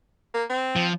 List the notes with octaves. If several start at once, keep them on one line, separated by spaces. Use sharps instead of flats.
A#3
C4
F3